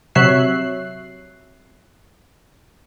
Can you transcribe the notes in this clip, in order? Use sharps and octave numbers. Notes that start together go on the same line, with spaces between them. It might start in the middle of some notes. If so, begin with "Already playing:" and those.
C3 F#3 C#5 E5 F#6 C7